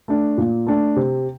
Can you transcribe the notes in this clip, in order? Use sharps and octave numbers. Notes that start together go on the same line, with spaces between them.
A3 D4
A#2
A3 D4
C3